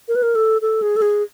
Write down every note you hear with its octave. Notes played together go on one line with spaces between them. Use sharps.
A#4
B4
A#4
A4
A4
G#4
A4
G#4